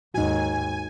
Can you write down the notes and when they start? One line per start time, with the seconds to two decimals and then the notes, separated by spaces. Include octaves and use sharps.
0.14 D#2 G#2 D#4 F#4 G#5